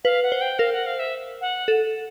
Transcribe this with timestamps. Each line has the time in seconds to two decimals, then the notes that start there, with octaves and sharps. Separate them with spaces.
0.04 B4 F5
0.23 F#5
0.32 C5
0.41 G5
0.59 A#4 F5
0.73 F#5
0.86 F5
0.99 E5
1.41 F#5
1.68 A4